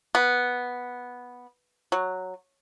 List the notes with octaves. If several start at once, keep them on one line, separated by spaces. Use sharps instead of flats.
B3
F#3